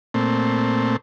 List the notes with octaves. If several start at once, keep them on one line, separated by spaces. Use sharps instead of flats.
A#2 A3 C4